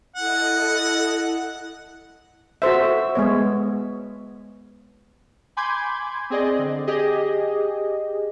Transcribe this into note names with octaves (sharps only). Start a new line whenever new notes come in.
E4 A4 D#5 F#5
F#4 A4 C5 E5
G#3 B3 C#5
G#5 B5 C6 D6 G6 G#6
C4 G#4 D5 D#5
D3
G4 G#4 D#5